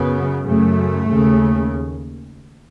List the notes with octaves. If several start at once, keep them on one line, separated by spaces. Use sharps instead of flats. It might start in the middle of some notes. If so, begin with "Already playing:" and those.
Already playing: F#2 C#3 B3
F#2 C#3 A3
D#2 C#3